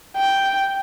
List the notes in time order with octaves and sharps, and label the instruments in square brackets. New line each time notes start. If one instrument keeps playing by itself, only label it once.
[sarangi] G5